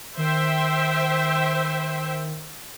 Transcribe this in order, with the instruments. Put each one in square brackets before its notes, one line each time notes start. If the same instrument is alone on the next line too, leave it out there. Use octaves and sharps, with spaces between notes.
[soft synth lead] D#3 [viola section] C5 E5 G5